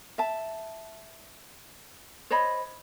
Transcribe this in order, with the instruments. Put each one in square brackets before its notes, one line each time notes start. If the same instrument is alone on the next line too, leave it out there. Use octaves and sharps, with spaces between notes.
[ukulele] E5 A5
C5 C#5 D#5 B5